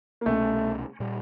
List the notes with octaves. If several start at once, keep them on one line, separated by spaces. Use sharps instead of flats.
A#3
C2 B2 G#3 A3 C#4
A#2 G3